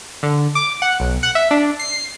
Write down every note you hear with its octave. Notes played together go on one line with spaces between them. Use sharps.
D3
D6
F#5
B1
F#5
E5
D4
C7